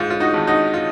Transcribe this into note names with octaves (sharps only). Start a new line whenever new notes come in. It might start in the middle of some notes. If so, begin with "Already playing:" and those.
Already playing: G#2 F4
F4
D#4 F#4
G#1
D#4 F#4
F4